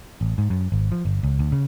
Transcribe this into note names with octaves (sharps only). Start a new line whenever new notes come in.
A1
G#2
F#2
G#1
F3
G1
C#2
D2
C#3